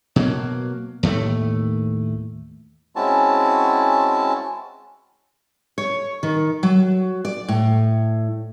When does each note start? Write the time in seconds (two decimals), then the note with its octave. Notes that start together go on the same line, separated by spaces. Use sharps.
0.16 B2 F#3 A#3
1.03 D#2 A2 A3
2.96 G#3 C4 C#4 E4 F#4 A5
5.78 C#5
6.23 D#3
6.63 F#3
7.25 D5
7.48 A2